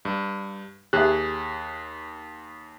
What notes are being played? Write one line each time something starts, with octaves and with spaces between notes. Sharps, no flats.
G2
D#2 G4 G#4 E5 F#6